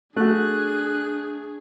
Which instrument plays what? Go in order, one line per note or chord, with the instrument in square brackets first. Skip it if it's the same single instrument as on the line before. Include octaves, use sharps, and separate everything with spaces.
[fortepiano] A3 F#4 [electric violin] D4 G#4 [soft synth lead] F#6